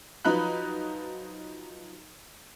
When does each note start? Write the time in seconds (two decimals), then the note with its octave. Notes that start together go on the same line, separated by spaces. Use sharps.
0.25 F3 F#3 D#4 B4 B5 F#6